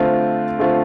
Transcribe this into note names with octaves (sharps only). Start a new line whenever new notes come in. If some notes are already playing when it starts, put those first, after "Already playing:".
Already playing: D3 A3 C4 F4
D3 A3 C4 F4